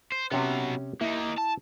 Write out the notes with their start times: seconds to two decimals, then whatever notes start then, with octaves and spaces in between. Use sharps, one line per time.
0.12 C5
0.32 C3 F#3 B3 C#4 G4
1.01 A#3 D#4 E4
1.38 A5